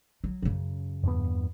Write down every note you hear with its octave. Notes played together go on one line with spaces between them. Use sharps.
F#3
F#2 C#3
E2 G2 B3